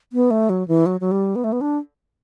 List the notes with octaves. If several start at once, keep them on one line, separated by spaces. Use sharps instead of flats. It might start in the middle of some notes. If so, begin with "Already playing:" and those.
B3
A3
F#3
E3
F#3
F#3
G3
B3
A3
B3
D4